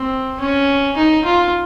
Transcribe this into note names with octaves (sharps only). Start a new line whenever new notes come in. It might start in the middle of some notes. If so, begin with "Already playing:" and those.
Already playing: C4
C#4
D#4
F4